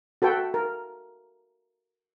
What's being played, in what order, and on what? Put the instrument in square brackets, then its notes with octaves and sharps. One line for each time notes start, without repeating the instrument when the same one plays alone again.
[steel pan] F#4 A4 B4 G5
A#4